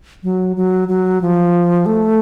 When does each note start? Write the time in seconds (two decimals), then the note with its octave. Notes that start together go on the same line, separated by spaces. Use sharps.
0.23 F#3
0.56 F#3
0.88 F#3
1.21 F3
1.86 A3